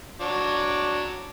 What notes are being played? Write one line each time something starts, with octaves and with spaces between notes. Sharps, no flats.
F#3 D4